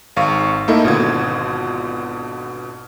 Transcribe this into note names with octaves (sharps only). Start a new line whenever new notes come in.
G#1 F5 C#6 D#7
A3 A#3 D#4 E4 A4 D#5
G#1 B2 D3 F4 D#6 G#6